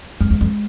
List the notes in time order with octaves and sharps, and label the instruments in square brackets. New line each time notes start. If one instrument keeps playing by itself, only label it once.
[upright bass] F2 [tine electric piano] G#3
[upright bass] E2
F2